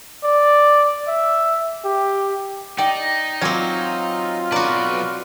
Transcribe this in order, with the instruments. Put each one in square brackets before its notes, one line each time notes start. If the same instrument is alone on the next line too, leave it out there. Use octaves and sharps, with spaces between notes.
[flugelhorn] D5
E5
G4
[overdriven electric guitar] D#4 [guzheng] D5 [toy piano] G5
[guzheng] F#3 C4 [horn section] F4 [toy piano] D5 G#5 D6
[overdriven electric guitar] B1 B4 [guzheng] F#4 D5 [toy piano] A#5